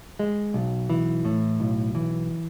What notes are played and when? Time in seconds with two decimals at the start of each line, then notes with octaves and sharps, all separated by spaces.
0.19 G#3
0.54 B1
0.90 E3
1.25 A2
1.60 B1
1.95 E3